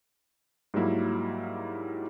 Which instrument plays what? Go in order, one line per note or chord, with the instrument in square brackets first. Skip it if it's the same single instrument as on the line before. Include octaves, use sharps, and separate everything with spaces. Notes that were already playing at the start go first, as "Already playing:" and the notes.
[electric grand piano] G#2 F#3 G3 A#3 E4